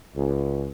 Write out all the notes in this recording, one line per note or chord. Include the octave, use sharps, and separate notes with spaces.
C#2